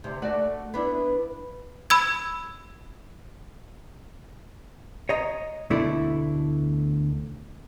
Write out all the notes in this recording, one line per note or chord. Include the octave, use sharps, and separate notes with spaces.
D2 C3
A3 F#4 D5
B3 D4 E4
B5 E6 G#6
C#5 D#5 A#5
D2 B2 D3 A3 E4 D5